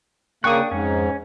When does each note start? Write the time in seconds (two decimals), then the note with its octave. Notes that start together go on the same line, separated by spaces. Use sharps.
0.44 C#3 A#3 D4 G5 C#6 D#6 F#6
0.71 F2 G#2 G#3 C#4